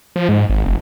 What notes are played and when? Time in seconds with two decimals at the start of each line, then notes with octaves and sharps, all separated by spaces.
0.16 F3
0.29 G#2
0.50 G#1
0.65 F1